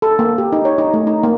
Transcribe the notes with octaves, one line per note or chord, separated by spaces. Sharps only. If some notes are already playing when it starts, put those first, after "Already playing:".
A4
A#3
G4
D#4
C#5
D#4
A3
D#4
A#3